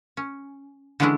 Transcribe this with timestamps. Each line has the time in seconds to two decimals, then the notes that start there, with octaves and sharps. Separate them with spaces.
0.17 C#4
1.00 D3 E3 G#3 C#4 D4 E4